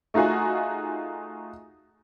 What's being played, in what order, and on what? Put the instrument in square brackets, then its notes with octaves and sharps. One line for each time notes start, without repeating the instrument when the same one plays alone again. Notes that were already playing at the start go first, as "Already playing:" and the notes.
[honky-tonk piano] A3 D#4 F4 F#4 G#4